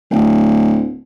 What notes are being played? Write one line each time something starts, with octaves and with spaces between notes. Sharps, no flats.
D1